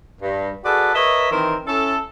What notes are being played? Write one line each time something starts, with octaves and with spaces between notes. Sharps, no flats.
G2
F#4 G#4 A4 B4 D5
A#4 B4 C#5 D#5 E5
D#3 E3 C4 A#4 C5
C#4 E4 A4